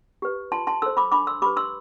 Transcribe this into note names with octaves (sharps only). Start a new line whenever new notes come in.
G4 B4
F4 A5 C6
A5 C6
A4 C5 C6 E6
B5 D6
D4 B5 D6
C6 E6
G4 B4 B5 D6
C6 E6